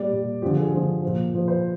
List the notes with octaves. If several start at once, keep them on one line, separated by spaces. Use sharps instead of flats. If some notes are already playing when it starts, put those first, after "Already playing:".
Already playing: A#2 G3 D5
A#2 G3
D3 F3 G4
G#4
D3 F3
A#2 F3
A#2 F3
C5